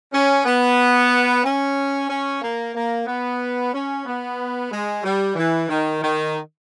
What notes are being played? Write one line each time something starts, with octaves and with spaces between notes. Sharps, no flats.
C#4
B3
C#4
C#4
A#3
A#3
B3
C#4
B3
G#3
G3
E3
D#3
D#3